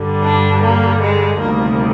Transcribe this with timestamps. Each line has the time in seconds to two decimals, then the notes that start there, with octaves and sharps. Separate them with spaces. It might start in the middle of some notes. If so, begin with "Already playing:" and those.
Already playing: G2 D3 G3
0.23 D4
0.62 A#3
1.01 G#3
1.39 D2 C3 D#3 G3 A#3